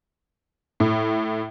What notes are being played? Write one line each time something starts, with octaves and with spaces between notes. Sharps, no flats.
A2